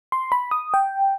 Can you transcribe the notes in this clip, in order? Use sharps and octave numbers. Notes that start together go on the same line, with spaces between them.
C6
B5
D#6
G5